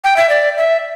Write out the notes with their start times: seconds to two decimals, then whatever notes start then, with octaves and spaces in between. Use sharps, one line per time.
0.04 G5
0.17 E5
0.29 D5
0.57 E5